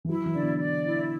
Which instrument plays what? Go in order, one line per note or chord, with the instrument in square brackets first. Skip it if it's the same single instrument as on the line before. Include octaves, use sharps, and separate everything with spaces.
[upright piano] E3
[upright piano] F#3 [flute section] E4
[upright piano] E3
[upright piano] D3 [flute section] D5
[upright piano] B2
[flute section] D5
E4